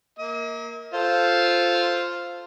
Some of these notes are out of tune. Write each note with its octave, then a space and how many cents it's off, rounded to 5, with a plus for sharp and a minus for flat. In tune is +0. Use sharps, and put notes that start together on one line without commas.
A#3 +0 D#5 +45
F4 +0 A4 +0 C5 +0